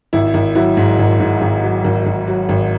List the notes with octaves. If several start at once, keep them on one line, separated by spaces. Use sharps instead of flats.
G#1 E4
G#1
F#3 E4
G#2
G#1
G#2
G#1
F#3
G#1
G#1
F#3
G#1